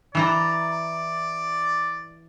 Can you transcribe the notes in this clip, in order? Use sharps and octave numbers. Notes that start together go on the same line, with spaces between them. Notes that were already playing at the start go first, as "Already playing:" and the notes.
E3 E4 D5 A#5